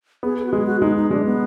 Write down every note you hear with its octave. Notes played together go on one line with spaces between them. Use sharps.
B3 G#4
G#4
F#4
G#3 G#4
F#4
G#3 D#4
D#4
G#3 D4
B3